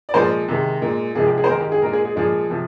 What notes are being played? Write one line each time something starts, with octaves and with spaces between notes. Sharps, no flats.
D5
A#2 F3 G#3 C5
C3 D#3 G#3
A#2 G#3
C3 F3 G#3 G#4
G4
G#4
C5
G#2 D#3 G#3 A#4
G4
G#4
A#2 G#3 A#4
G#4
G#4
A#2 F3 G#3 G#4
C3 F3